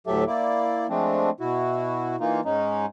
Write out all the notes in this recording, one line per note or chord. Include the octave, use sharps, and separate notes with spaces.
D2 A2 F#3 G4 A4 E5
A#3 E4 D5
F3 G#3 A3 C4 D4
B2 E4 F#4
E3 A#3 D#4 F4
G#2 G#3 C#4 D#4